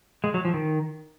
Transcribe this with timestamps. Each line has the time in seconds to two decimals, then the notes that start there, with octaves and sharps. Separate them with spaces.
0.24 G#3
0.34 F#3
0.45 F3
0.54 D#3